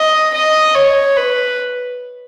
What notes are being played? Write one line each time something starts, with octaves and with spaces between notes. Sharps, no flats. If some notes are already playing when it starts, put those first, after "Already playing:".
Already playing: D#5
D#5
C#5
B4